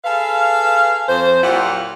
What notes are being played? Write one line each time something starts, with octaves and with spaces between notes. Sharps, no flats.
G#4 A4 B4 F5
F2 C5
A#2 F#3 E4 F4 G4 F#5